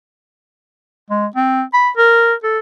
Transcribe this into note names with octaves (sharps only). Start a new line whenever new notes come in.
G#3
C4
B5
A#4
A4